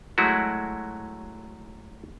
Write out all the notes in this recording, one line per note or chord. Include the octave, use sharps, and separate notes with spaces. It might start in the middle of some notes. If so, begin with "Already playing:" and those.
F#3 G#3 A3 E4 F#4